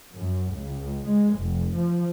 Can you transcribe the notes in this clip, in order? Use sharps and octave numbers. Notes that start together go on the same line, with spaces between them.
F#2
C#2
G#3
F1
F3